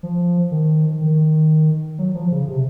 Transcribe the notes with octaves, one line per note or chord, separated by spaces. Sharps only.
F3
D#3
D#3
F#3
F3
C#3
C3